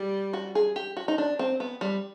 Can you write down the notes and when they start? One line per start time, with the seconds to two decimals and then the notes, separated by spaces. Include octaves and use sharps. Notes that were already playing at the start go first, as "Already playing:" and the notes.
Already playing: G3
0.33 F#4
0.55 G#4
0.76 G4
0.97 F#4
1.08 D#4
1.18 D4
1.39 C4
1.60 B3
1.81 G3